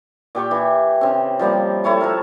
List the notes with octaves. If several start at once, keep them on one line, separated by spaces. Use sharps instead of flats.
A#2 G4 G5 C#6
E3
C#3 C4
F3 G3 A#3
A3 E4 C#5 A5
F3 A4 A#4